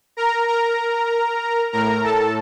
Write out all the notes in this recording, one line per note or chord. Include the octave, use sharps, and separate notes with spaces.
A#4 A#5
A#4 A#5
A2 A#4 A#5
A4 A5